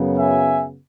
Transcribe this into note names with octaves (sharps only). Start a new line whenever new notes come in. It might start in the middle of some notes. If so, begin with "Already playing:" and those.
Already playing: F#2 C#3 F#3 B3
E5 G#5